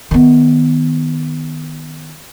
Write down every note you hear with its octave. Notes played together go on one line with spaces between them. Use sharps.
D#3 B3